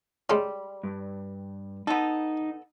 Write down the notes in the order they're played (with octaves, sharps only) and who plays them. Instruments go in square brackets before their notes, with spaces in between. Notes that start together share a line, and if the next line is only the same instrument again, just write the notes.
[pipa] G3 [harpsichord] G#3 C#4
[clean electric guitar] G2
[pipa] B3 A4 [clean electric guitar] D#4